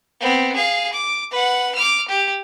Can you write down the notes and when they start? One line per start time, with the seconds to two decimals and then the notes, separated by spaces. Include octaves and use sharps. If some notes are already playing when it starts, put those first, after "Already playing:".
0.20 B3 C4
0.55 G#4 F5
0.93 D6
1.31 B4 F#5
1.75 D6 F6
2.08 G4